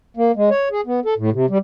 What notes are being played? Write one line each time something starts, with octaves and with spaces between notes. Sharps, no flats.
A#3
G#3
C#5
G#4
B3
A4
A2
C3
G3